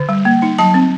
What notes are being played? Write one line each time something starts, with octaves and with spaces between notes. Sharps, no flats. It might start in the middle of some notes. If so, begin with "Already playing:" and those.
Already playing: D3
G3
A#3
D#4
F#3 A5
C4